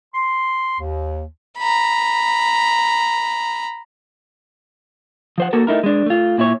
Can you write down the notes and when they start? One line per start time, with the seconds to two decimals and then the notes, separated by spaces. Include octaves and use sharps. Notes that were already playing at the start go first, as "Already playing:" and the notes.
0.14 C6
0.80 D#2
1.59 A#5 B5
5.38 F3 C5 F#5
5.53 A#3 F#4 A4 A#4
5.67 A3 D#4 E4 A#4
5.84 G#3 D4
6.06 A3 F4
6.38 A#2 E4 C#5